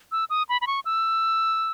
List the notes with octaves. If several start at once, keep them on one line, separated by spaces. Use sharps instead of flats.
E6
D#6
B5
B5
C#6
E6